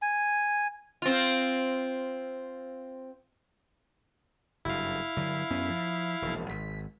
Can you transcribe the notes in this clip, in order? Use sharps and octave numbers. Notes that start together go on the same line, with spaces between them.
G#5
C4 F4
F#1 G2 E4 F5
G2 D3 F#3
F#2 B3 C#4
F3
E1 A#1
G#1 B6